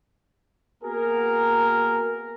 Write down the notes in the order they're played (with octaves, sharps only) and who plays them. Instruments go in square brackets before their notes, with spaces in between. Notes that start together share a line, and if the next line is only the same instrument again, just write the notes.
[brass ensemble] A#3 B3 F#4 G#4 A#4